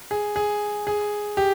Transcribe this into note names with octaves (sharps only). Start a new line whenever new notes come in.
G#4
G#4
G#4
G4